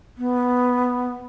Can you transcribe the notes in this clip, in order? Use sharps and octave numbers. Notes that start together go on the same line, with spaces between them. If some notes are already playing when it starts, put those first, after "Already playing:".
B3